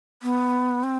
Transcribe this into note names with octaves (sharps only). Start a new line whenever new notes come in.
B3
C4